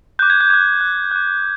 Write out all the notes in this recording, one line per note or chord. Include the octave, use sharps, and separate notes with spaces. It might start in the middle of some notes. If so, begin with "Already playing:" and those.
D6 F#6 G6
G#6
G6
D6 F#6 G#6
D6 F#6
D6 F#6